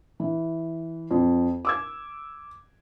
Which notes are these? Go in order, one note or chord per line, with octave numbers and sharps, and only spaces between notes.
E3
F2
D6 E6 G#6